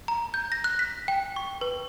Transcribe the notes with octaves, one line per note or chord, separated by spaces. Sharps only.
A#5
G6
A#6
F#6
B6
G5
C#6
B4